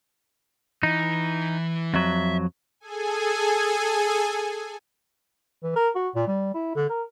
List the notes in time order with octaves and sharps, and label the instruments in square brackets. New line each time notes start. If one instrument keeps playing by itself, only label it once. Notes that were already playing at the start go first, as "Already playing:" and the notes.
[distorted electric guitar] E3 [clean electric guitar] D#4
[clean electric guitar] F2 F#3 [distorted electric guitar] E5
[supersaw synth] G#4 A4 G#5
[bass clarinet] E3
A#4
F#4
A#2
G3
E4
D3
A#4